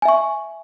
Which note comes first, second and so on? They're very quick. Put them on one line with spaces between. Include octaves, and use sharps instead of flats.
G#5 E5 C#6